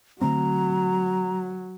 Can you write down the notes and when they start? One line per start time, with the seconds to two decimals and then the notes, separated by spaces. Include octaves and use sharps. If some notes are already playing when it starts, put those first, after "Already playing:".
0.21 D3 F#3 A3 C4 A#5